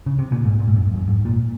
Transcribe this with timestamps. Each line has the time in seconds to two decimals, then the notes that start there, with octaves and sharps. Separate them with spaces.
0.06 C#3
0.19 C3
0.32 A#2
0.45 G#2
0.59 A#2
0.68 G#2
0.76 F#2
0.94 F2
0.98 F#2
1.09 G#2
1.25 A#2